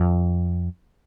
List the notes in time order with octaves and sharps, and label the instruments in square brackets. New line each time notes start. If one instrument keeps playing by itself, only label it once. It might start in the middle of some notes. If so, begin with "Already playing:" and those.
Already playing: [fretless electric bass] F2